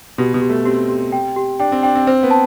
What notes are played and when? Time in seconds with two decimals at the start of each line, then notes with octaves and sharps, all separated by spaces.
0.18 B2 G4
0.34 B2
0.42 G4
0.49 A3
0.65 C4 G4
0.89 G4
1.12 G5
1.36 G4
1.60 D4 G5
1.72 C4
1.83 D4 G5
1.95 C4
2.07 C4 C5
2.23 B3
2.31 A5